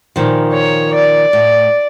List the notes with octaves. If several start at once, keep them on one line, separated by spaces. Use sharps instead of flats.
A#2 D#3 F3
C#5
D5
A2